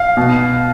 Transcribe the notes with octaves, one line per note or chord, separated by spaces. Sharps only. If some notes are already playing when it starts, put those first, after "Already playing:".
Already playing: F5
B2